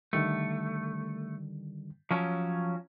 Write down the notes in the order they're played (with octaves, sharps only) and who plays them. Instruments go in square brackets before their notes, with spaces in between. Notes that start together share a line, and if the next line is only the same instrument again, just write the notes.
[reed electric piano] D3 D#3 G3 [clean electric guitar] A3
[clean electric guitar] F3 F#3 C#4